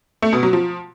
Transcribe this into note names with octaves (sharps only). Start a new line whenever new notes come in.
A3
B2
F#3
F3